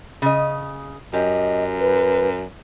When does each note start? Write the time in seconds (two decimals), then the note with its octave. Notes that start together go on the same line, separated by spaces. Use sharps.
0.22 C#3 D#5
1.13 F#2 G4 D#5
1.80 B4